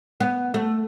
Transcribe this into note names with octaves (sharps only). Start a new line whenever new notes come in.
B3
A3